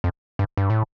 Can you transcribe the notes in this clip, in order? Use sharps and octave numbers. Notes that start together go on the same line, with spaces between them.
F2
G2
G2
A2